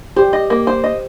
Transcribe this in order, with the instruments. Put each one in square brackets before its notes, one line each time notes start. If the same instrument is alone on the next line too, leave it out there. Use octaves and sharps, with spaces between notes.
[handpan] G4 [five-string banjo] C5
[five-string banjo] D#5
A#3
C5
D#5